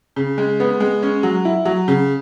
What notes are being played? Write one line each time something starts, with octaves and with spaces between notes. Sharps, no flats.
C#3
G#3
B3
G#3
C#4
F#3
E4
F#3
C#3